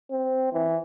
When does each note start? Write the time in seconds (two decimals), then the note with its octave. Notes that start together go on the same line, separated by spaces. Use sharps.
0.11 C4
0.53 E3